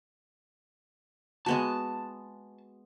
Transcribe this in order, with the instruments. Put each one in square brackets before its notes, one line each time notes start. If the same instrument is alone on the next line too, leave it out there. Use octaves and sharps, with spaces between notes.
[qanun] G#3 B3 F#4 [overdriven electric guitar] A5